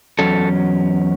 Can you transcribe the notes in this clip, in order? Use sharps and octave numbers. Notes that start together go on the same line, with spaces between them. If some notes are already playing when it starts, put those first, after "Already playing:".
E2 B2 F#3 C#4 A4